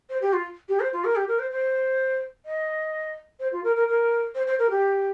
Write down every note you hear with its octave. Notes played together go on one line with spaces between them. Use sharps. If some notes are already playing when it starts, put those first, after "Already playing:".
C5
G4
F4
G4
C5
F4
A#4
G4
A#4
C5
C5
D#5
C5
F4
A#4
A#4
A#4
C5
C5
A#4
G4